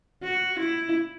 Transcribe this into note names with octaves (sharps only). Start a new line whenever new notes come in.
F#4
E4